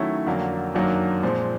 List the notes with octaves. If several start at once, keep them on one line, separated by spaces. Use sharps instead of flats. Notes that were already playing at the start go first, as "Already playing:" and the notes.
Already playing: D#3 F#3 A3 C#4 E4
F2 D3 F#3 A#3
F#2 D#3 F#3 A#3 D4
A#2 F3 G#3 C4